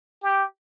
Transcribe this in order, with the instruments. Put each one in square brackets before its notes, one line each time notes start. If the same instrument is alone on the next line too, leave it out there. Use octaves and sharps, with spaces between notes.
[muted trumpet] G4